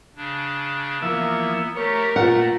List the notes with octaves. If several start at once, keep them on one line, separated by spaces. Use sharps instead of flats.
C#3 D4
E3 F3 A#3 B3 E5
A3 G4 A#4 C#5
A#2 A3 F4 F#5